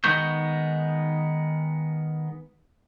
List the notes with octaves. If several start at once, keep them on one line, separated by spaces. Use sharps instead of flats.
D#3 G#3 B3 C#6 G6